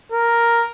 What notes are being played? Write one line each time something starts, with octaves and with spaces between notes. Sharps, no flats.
A#4